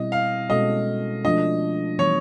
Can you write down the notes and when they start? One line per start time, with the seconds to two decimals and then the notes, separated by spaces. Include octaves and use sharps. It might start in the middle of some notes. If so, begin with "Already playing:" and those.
Already playing: B2 G3 C4 E4 D#5
0.12 F5
0.50 B2 G#3 C#4 F#4 A4 D#5
1.25 F3 A3 D4 F4 D#5
1.99 E3 G3 B3 C#5